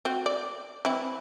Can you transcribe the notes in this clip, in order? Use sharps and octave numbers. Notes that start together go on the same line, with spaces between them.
C4 F#4
D5
E3 C4 E4